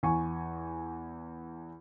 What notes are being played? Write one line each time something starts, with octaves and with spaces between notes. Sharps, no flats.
E2 G#5 C#6